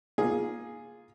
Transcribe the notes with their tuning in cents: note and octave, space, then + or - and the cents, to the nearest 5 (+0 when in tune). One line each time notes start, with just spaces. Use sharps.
A#3 +20 F4 +0 G#4 +0